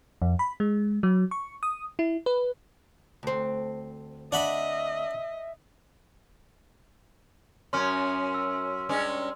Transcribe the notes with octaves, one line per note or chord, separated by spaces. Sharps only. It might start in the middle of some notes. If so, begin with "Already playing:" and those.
F2
B5
G#3
F#3
C#6
D#6
E4
B4
D2 C4
D4 D#5 E5 F#5 B5
F#2 C#4 C6 F6
E6
G2 G#3 C#4